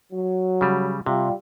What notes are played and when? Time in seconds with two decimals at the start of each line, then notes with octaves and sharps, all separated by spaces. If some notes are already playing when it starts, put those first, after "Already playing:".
0.12 F#3
0.61 C#3 G3
1.06 C3 G3 F4